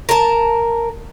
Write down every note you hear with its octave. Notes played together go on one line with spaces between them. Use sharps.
A#4 A5